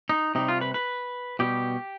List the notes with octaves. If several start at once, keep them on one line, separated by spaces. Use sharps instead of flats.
D#4
C3 G3 D#4
F4
B4
B4
B2 G3 G4